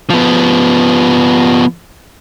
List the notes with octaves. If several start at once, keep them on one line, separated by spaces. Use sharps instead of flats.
F3 B3